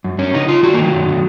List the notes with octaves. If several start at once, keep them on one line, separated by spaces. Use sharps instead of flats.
F#2
F#2 C#4
C#3 D#4
C#3 F4
D#3 F#4
A#3
D#3
F#3
F#2
D#3